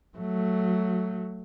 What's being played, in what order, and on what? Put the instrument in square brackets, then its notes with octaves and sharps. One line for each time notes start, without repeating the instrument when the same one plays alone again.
[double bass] F#3 A3